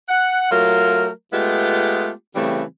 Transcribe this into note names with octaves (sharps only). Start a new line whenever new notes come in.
F#5
F#3 A3 F4 A#4
G#3 A3 B3 F4 G4
C#3 E3 G3 A3 C4